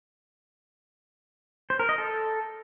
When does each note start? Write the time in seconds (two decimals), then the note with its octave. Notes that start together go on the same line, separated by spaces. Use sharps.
1.70 C5
1.80 A#4
1.89 D#5
1.98 A4